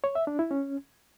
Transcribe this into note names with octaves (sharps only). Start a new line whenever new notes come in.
C#5
E5
D4
E4
C#4